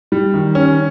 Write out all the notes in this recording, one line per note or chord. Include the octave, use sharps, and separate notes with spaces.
G3
D#3
C#4